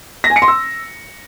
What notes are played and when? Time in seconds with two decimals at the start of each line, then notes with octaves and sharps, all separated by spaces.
0.24 A#6
0.30 G#5
0.36 C#7
0.42 C6
0.48 E6